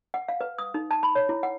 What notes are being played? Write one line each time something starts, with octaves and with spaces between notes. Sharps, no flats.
F#5
F5
B4
D#6
D#4
A5
B5
C#5
E4
F#5